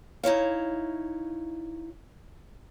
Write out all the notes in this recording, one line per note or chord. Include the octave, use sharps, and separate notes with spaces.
D#4 E4 C#5 F5